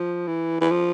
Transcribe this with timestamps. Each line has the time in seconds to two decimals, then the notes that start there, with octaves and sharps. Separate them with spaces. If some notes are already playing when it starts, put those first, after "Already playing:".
Already playing: F3
0.27 E3
0.61 E3
0.71 F3